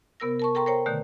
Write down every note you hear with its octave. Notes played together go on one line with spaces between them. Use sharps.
C3 B3 A#4 E6 A#6
A#4 A5 C#6
A4 A#4 G5 A#5 C6 C#6
A#4 C5 C#5 G5 A#5
B2 D3 D#3 A3